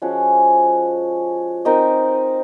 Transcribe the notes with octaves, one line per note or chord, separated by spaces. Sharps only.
F3 G#3 C#4 F#4
C4 D#4 A#4 D#5